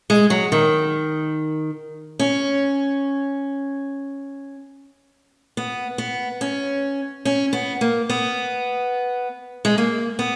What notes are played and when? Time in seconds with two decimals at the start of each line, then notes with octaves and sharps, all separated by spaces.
0.10 G#3
0.30 F#3
0.52 D#3
2.19 C#4
5.57 B3
5.98 B3
6.41 C#4
7.25 C#4
7.53 B3
7.81 A#3
8.10 B3
9.65 G#3
9.78 A#3
10.19 B3